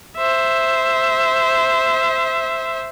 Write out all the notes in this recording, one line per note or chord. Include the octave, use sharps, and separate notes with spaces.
C5 E5